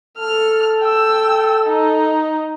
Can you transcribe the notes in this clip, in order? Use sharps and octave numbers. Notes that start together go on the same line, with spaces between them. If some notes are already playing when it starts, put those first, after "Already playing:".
A4 F6
G5 E6
D#4